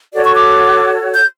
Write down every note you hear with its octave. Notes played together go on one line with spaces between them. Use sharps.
F#4 A4 C#5 D5
C#6
D6
G6